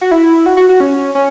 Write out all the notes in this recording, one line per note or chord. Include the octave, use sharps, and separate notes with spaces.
F#4
E4
F#4
F#4
F#4
C#4
C#4